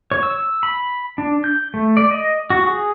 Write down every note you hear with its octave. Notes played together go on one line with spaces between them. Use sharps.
C#5
E6
B5
D4
G6
A3
D5
D#5
F#4
G#4